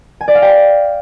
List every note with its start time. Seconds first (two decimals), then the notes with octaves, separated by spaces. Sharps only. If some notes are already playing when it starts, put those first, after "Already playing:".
0.21 G#5
0.28 D5
0.35 F5
0.42 G5